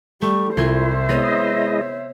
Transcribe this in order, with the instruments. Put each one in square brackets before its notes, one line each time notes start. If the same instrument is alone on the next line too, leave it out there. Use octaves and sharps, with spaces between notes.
[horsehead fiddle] G3 [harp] A3 [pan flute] C#6
[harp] C2 C6 G#6 [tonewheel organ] E4 [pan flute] F4 [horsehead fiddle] C5 E5
[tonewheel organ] G#3 E4 D#5 [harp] B3 [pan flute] C#5